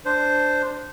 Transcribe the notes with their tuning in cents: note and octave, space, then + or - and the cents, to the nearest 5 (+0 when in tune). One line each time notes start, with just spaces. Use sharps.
D4 +0 C5 -10